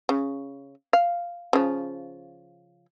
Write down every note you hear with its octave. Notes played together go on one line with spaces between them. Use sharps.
C#3
F5
C#3 F3